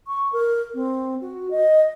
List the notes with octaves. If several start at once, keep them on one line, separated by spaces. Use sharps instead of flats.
C#6
A#4
C4
F#4
D#5